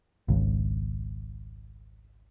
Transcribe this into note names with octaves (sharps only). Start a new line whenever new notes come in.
G#1 C#2